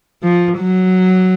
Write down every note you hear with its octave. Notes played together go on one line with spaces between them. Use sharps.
F3
F#3